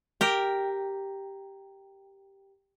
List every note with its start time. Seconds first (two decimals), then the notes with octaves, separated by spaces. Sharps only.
0.21 G4 A#4 G5